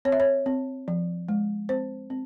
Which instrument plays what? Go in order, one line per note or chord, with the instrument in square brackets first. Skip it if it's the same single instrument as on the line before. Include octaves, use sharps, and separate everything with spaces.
[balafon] C4 C#5
E5
C#5
C4
F3
G#3
C4 C5
C4